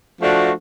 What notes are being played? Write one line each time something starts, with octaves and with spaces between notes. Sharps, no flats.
F3 A3 D4 F#4